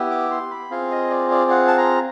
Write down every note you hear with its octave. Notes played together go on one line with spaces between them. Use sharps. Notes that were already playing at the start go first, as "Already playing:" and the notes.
Already playing: B3 E4 G4
D6
C6
B5
C4 F4 G#4 F5
D#5
D5
D5
F#5
A5
A#5